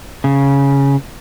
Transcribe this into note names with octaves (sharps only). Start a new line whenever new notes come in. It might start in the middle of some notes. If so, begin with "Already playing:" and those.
C#3